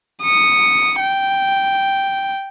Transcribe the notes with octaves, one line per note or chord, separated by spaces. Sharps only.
D#6 C#7
G5